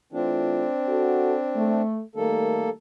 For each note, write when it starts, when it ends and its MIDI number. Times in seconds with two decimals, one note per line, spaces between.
0.13 0.66 52
0.13 0.66 57
0.13 1.82 60
0.13 1.82 62
0.13 0.66 65
0.88 1.34 66
0.88 1.34 69
1.55 2.00 57
2.15 2.71 51
2.15 2.71 55
2.15 2.71 57
2.15 2.70 58
2.15 2.70 69